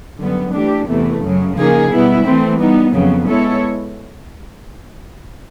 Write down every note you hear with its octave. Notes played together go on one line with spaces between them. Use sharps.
F#2 D3 G3 B3
E3 A3 D4 G4
E2 C3 E3 A3
F#2 C#3 F#3
C#3 F3 A#3 D#4 G#4
B2 G3 B3 E4
E3 A3 C4
G3 B3 D#4
F2 C#3 F#3 B3
G#3 B3 E4 A4 C#5